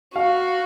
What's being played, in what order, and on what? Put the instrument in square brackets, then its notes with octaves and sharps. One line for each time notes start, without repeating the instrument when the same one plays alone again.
[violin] F#4 [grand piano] F5